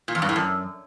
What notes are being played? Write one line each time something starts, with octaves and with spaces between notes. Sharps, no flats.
A#2
F2
G2
A2
F#2